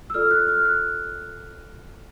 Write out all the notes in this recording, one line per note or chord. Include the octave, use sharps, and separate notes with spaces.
E6
F4 A4 D5 F6
F#6
F6
F#6